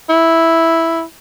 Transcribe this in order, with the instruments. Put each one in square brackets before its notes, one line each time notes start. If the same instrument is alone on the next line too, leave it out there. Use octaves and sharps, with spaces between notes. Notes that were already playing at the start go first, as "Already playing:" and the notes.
[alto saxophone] E4